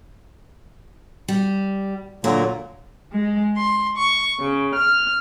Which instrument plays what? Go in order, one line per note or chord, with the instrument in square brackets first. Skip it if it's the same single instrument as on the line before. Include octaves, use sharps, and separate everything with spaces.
[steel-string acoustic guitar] G3
[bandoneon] A#2 D3 F#3 [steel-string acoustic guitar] A#3
[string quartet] G#3
C6
C#6
C#3
F6